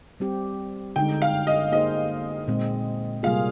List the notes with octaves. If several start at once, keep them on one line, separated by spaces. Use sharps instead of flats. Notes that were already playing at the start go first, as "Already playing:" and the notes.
G3 C4 G4
D3 G#3 D#4 G5
F5
D#5
A#3 D#4 G#4 C5 D#5
A#2 G#3 C4
C3 G3 A#3 F4 G#4 F5